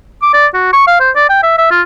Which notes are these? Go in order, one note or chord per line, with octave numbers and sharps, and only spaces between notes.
D6
D5
F#4
C#6
F5
C5
D5
G5
E5
E5
F4